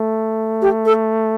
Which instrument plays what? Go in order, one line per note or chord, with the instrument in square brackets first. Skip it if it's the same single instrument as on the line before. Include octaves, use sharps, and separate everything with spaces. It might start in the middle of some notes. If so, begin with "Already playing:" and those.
Already playing: [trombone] A3
[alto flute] G4
A4